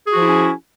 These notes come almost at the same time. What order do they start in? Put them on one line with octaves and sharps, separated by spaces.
G#4 F#4 F3 E4 C#4